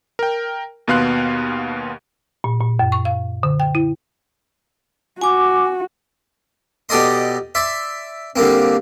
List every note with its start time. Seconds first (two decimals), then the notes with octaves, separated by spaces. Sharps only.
0.19 A#4 G5
0.88 D#2 B2 B3 F5 C6 F#6
2.44 A#2
2.60 A#2
2.79 F#2
2.92 C#6
3.05 F5
3.43 D3
3.60 G5
3.75 E4
5.21 F#4 G#5 D6
6.89 B2 G4 A4 D5 D#5 C6
7.55 D5 E5 C6
8.36 D3 G3 A#3 C4